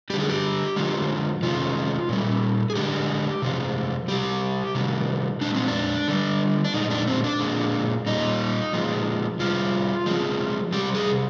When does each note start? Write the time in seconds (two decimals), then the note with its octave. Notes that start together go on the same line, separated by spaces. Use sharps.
0.10 D3 G3 G4
0.20 G#4
0.30 G4
0.76 D3 F3 G#3
1.43 C3 D#3 G#3 F4
2.09 A#2 G3
2.70 G#4
2.75 D3 G#3 G4
3.42 C3 F3 G#3
4.08 C3 G3 G4
4.75 C3 D#3 G3
5.41 A#2 G#3 D4
5.54 C4
5.68 D4
6.08 D3 G3
6.64 D4
6.74 A#2 G#3 D#4
6.90 D4
7.07 C4
7.24 D4
7.40 A#2 G#3
8.06 A#2 G3 D#4
8.73 A#2 F3 G#3
9.39 C3 G3 F4
10.06 C3 F3 G#3
10.72 C3 G3 G4
10.95 G#4